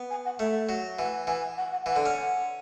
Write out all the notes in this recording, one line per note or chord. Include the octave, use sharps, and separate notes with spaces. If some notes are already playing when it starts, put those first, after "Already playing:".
Already playing: B3
G#5
F#5
A3 E5
F#3
E3 F#5
E3 G#5
G#5
F#5
F#5
E3 F#5
D3
C#4